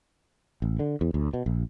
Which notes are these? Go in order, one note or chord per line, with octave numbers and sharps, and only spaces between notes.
A1
D3
E2
D2
B2
A#1